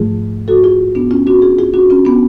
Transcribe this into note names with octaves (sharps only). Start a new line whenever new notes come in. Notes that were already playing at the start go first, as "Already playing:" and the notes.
Already playing: G#2 F3 A3 F4 G#4
F#4 A4
F4 G#4
B3 D4
C#4 F4
D4 F#4
F4 G#4
F4 G#4
D4 F#4
C#4 F4
B3 D4